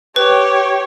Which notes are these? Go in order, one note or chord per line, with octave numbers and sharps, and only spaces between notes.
G4 B4 C#5